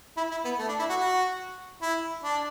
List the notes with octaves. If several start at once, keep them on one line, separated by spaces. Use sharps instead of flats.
E4
E4
B3
A3
D4
E4
F#4
F#4
E4
D4